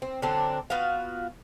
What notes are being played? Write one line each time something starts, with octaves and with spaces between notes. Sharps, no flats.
C4
D3 F#3 C4 D4
B3 F4 F#4 F5